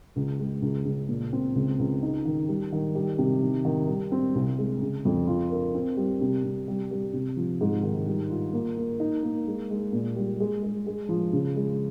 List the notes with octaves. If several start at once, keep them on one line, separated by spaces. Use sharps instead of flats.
C#2
G#3
C#2
C#3
A#2
C4
C#2
C#2
D#4
D#3
G3
D#3
G3
C3
D#3
D#3
G3
C4
C2
G#3
C#3
F2
F4
A#4
C4
G3
C3
C3
G3
G3
C3
F3
G#2
D#3
G3
F4
A#3
A#3
D#4
A#3
G#3
G#3
A#2
G3
G#3
G#3
G#3
F3
C#3
G#3